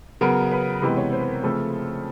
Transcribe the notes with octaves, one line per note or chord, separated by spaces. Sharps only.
C#3 F#3 B3 A#4
B4
C3 E3 G#3 B3 B4
C#5
C5
B4
A#4
C#3 F3 A3 C4 A4